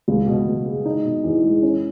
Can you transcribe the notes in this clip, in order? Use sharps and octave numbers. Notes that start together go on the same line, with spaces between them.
C#2
B2
C#2
G#3
D#4
B2
E2
G#3
C#4